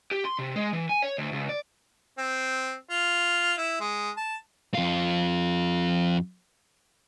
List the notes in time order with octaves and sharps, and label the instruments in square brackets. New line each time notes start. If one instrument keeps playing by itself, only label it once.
[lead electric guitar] G4
C6
C3
G#3
E3
G#5
C#5
D2
C#2
D5
[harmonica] C4
F4
E4
G#3
A5
[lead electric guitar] F2 F4